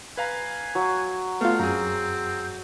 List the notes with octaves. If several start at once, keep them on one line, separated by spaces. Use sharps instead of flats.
B4 F5 G#5 A#5
F#3
A3 B3 F4 F5
F#2 C4 G#4 A#5